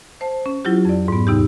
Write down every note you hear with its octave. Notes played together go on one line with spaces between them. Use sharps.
C5 A5
C#4
F#3 E4 F4 G4
F2 D5
G#2 B3
D#2 C3 D#4 G4